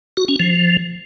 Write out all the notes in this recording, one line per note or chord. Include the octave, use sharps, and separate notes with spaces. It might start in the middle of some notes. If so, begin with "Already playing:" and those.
F#4
C#4
F3